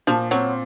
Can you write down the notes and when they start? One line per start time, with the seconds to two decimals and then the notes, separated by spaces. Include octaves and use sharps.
0.07 A#2 F3
0.31 F#3 C4